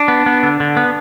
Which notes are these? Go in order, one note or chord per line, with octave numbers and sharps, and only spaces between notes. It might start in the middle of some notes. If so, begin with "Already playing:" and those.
Already playing: D4
B3
B3
D3
D3
B3